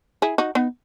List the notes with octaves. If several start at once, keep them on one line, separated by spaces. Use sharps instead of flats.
E4 G#4
D#4 F#4
B3 D#4